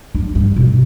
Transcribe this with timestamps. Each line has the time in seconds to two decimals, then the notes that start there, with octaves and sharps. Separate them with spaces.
0.15 D4
0.35 G2
0.56 B2